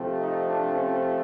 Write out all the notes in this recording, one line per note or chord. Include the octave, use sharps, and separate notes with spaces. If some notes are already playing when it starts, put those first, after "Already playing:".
Already playing: C3 F3 A3 C4
D#4
D4
C#4